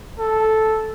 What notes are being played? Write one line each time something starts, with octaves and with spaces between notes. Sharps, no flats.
A4